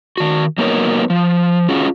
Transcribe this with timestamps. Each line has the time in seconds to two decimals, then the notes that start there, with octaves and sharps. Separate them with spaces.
0.17 D#3 F#4
0.58 F#3 A#3 B3 D#4 A#4 C#5
1.10 F3
1.69 C#4 F4 F#4 G#4